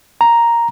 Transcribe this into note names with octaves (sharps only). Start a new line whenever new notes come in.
A#5